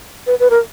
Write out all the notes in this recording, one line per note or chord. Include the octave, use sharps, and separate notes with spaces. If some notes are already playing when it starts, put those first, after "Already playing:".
B4
B4
A#4